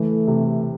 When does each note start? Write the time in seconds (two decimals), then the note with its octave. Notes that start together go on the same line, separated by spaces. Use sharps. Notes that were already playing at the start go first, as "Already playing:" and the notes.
Already playing: E3 A3
0.27 C3